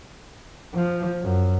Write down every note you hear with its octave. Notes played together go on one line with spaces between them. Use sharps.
F3
F#2